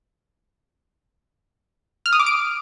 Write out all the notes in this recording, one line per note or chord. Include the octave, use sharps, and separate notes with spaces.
F6
D#6
D6
D7